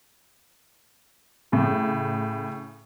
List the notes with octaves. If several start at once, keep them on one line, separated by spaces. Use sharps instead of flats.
A2 C#3